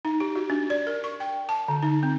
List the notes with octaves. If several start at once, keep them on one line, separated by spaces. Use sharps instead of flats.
D#4
G4
F#4
D4
D5
A#4
C#6
G5
A5
D3
D#4
C4